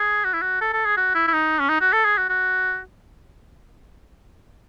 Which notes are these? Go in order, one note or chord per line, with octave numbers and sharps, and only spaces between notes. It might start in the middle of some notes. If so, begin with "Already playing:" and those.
Already playing: G#4
F#4
E4
F#4
A4
A4
G#4
F#4
E4
E4
D#4
C#4
D#4
F#4
A4
G#4
F#4
F#4